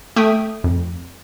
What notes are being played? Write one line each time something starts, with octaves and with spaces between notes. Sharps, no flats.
A3 E5 G5 D#6
F2